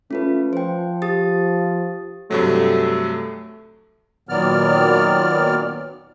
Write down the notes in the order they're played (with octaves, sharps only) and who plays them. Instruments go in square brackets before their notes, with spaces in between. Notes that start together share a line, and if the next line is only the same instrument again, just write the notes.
[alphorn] A3 [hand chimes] C#4 F4 B4
[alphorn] F3 [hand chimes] C5 G5
[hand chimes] G4 D#6 A6
[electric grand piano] G2 C3 F#3 [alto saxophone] A3
[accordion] A#2 D#3 F#3 B3 D5 F6